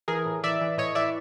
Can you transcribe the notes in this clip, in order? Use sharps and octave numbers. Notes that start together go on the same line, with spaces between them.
E3 G#4 A#4
A2
E3 D5 E5
E3
A2 C#5 D#5
E3 D5 E5